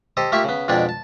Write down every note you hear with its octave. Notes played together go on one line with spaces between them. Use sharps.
G4 A4 C5 D#5
A3 A#3 F4 G4 E5 C#6
C#3 B3
F2 B2 G#3 D4 D5 G5
A5